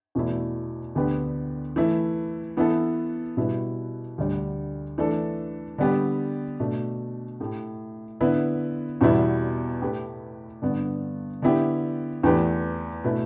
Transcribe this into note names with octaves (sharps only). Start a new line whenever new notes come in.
E2 B2 A3 E4
D2 D3 B3 G4 B4
E3 A3 E4
E3 B3 E4 A4
B2 G3 E4 B4
D2 D3 G3
E3 A3 D4 A4
D3 G3 B3 G4 B4
B2 A3 D4
A2 A3 G4
D3 B3 E4 B4
E2 B2 G3 B3 E4
A2 A3 G4 B4
G2 D3 B3
D3 B3 E4 G4
E2 E3 A3 G4 B4
B2 A3 E4 B4